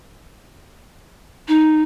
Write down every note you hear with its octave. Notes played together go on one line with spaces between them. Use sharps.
D#4